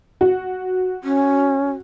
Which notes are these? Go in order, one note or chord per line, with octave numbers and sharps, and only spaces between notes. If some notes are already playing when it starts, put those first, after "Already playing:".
F#4
C#4